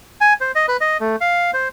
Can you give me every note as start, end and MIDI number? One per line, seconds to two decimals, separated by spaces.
0.21 0.33 80
0.41 0.52 72
0.55 0.66 75
0.68 0.77 71
0.81 0.97 75
1.00 1.16 57
1.21 1.51 77
1.54 1.68 72